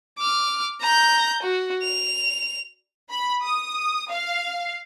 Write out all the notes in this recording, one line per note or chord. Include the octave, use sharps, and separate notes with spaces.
D6 F6
A#5 G6
F#4
F7
B5
D#6
F5